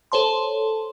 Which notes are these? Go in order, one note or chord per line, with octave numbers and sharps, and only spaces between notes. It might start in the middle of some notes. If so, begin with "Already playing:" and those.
A4 C5 C#5 A5 C6